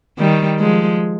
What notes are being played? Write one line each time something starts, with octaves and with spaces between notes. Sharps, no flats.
D#3 G3
F3 G#3